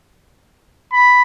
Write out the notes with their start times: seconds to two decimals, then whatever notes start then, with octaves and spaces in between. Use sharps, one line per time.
0.93 B5